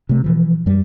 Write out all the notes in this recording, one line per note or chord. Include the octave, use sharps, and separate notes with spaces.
C3 A3
B2 E3 F3
F#2 G3